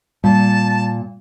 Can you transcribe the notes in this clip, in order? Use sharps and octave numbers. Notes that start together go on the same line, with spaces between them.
A#2 G3 A5